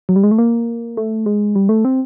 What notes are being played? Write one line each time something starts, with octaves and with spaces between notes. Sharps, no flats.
F#3
G3
G#3
A3
A#3
A3
G#3
G3
A3
C4